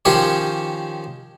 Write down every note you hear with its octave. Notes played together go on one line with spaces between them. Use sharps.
D#3 F3 C#4 G4 C5 C#5